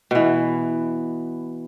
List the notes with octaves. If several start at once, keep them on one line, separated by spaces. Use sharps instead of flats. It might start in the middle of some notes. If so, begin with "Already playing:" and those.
B2 E3